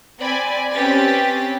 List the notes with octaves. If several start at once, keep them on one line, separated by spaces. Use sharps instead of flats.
C4 D5 G#5 B5
C4 C#4 G4 B4 A6 B6